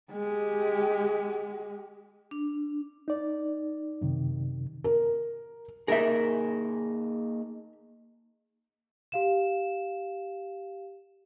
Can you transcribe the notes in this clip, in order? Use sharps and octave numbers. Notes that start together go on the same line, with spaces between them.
G#3 G4
D4
D#4 D5
F#2 C3 D#3
A#4
A#3 D#4 G#4 A#4 E5
G4 F5 E7